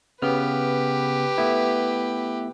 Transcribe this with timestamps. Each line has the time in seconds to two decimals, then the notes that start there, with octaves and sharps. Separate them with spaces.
0.22 C#3 B3 G4 B4 F6
1.38 A3 B3 E4